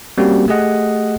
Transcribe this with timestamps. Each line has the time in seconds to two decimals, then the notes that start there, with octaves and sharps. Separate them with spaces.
0.18 G3 A#3 C4 C#4 F#4 G4
0.48 A3 G4 G#4 D#5 F#5